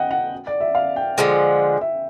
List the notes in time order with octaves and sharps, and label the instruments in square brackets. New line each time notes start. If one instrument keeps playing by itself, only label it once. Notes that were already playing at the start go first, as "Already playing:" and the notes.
Already playing: [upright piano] D#5 F#5 G5
F#5
D5
E5
F5
G5
[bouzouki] D3 F3 G#3
[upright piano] E5